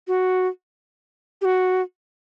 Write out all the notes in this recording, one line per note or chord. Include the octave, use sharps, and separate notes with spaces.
F#4
G4
F#4